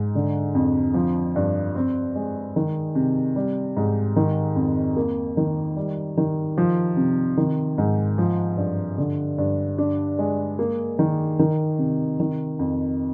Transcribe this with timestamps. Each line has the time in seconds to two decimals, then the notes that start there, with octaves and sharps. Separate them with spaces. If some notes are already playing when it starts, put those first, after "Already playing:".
Already playing: G#2
0.15 D3
0.55 F2
0.94 F3
1.36 G2
1.75 C4
2.16 G#3
2.56 D#3
2.95 C3
3.36 G3
3.77 G#2
4.16 D#3
4.56 F2
4.96 A#3
5.37 D#3
5.76 G3
6.17 D#3
6.58 F3
6.97 C3
7.37 D#3
7.78 G#2
8.18 F3
8.57 G2
8.98 D3
9.38 G2
9.78 D4
10.19 G#3
10.59 A#3
10.99 D#3
11.39 D#3
11.78 C3
12.20 D#3
12.59 F2